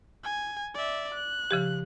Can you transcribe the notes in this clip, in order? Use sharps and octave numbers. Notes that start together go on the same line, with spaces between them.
G#5
D5 E5
F#6
C#3 F3 G4